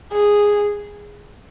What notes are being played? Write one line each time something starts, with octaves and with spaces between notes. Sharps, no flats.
G#4